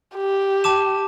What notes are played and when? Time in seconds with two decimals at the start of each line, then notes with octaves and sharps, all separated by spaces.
0.16 G4
0.64 A5 D6 E7